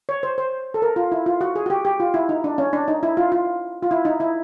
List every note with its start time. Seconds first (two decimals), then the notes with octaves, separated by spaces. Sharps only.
0.09 C#5
0.23 C5
0.38 C5
0.74 A4
0.82 A#4
0.96 F4
1.12 E4
1.26 F4
1.41 F#4
1.56 G#4
1.66 F#4
1.70 G4
1.85 G4
2.00 F4
2.14 E4
2.29 D#4
2.44 D4
2.58 C#4
2.73 D4
2.88 D#4
3.03 E4
3.17 F4
3.32 F4
3.83 F4
3.91 E4
4.05 D#4
4.20 E4